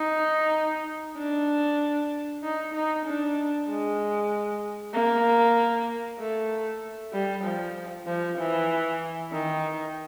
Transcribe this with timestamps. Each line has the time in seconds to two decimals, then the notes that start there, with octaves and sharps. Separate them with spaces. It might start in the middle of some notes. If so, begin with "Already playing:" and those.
Already playing: D#4
1.18 D4
2.43 D#4
2.74 D#4
3.06 D4
3.69 G#3
4.94 A#3
6.19 A3
7.13 G3
7.44 F3
8.07 F3
8.38 E3
9.32 D#3